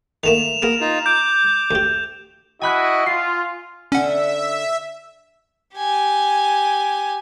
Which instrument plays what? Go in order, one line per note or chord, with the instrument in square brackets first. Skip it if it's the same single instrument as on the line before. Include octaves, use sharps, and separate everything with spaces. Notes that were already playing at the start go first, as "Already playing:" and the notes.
[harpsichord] D#3 A3 A#3 [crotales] E7 F7
[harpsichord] A#3 B3 G#4 [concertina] A#4
[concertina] D#4 F4
[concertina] D6 [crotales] G6
[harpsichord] D2 G4
[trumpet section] E4 F#4 D#5 [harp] G#5 B5 F#6
[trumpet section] F4 [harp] C7
[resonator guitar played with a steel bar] D3 D4 [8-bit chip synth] C#4 F#5 [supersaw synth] E5
[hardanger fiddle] G4 G#5